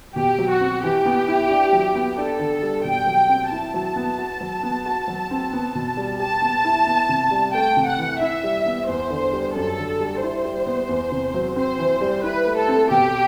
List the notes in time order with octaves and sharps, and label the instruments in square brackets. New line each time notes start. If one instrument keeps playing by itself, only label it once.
[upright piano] B2 [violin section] G4
[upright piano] F#3
[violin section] F#4
[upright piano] C4
[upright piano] E3 [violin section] G4
[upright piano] B3
E4
D4
F#3
B3
[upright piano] D4 [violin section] A4
[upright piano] D3
G3
[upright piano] B2 [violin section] G5
[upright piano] F#3
C4
[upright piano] E4 [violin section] A5
[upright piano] F#3
B3
F#4
F#3
B3
F#4
F#3
C4
B3
B2
G3
[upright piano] G4 [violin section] A5
[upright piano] B3
E4
B3
C3
G3
[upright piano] A3 [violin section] G5
[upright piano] C3
[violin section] F#5
[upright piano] E3
[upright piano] E4 [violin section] E5
[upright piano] G3
B3
[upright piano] E2 [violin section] C5
[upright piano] D3
G3
[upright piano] F#2 [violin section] A4
[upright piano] D3
G3
[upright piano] E4 [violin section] C5
[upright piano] G3
B3
E2
C3
F#3
[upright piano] C4 [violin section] C5
[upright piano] E3
G3
[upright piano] E4 [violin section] B4
[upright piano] A3
[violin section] A4
[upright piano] C4
[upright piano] B2 [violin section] G4